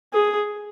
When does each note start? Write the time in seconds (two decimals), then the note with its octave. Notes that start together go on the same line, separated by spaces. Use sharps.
0.13 G#4